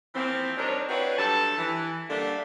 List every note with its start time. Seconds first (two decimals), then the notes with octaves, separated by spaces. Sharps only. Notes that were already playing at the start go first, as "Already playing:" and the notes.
0.15 E3 F3 A#3 C4
0.57 G3 D4 D#4 A#4 C#5
0.89 C4 D4 E4 F#4 B4 C#5
1.18 G2 F#3 A4 A5
1.58 E3
2.09 D3 G3 A3 A#3 D4